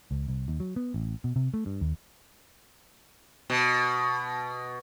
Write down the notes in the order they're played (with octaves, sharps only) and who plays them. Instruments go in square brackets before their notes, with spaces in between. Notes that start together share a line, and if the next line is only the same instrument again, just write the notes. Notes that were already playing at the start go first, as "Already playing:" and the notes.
[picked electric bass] C#2
C2
D#2
F#3
B3
A1
B2
C3
A3
G2
D#2
[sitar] B2